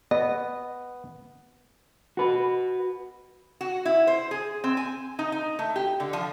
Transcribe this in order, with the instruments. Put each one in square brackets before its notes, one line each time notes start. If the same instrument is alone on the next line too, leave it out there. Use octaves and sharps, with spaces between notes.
[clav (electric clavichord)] B3 [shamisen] D#5
[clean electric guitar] F#4 B4
[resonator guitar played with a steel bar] F#4
E4
C5
G#4
C4
G#5
D#4
D#4
A3
G4
D3
F3